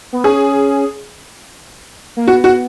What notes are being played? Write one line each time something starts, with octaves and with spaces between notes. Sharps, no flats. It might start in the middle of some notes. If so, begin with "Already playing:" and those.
B3
C#4 G#4
A#3
B3 F#4
F#4